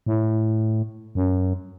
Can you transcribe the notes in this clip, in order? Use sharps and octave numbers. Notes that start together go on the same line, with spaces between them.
A2
F#2